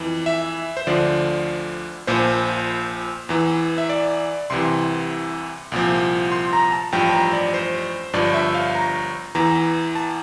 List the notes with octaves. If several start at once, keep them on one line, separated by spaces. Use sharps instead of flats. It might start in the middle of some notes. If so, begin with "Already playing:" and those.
Already playing: F2 E3
E5
C5
D2 D3 F3 D5
A#1 A#2 F3 C5
E2 E3
E5
D5
C2 C3 E3 C6
C2 A#2 F3
C6
A#5
A5
A1 G2 F3 G5
A#5
D5
C5
G1 G2 F3 D5
E5
F5
A#5
E2 E3 A#5
A5